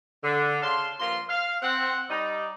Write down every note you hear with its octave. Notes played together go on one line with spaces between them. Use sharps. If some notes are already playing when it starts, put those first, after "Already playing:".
D3
C#3 F5 A5 C6
G2 F3 A#3 F4 C6
F5
C4 F#5
G3 D#4 D5